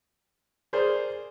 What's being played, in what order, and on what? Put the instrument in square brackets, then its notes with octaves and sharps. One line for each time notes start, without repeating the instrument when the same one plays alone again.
[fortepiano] G#4 A#4 C5 D5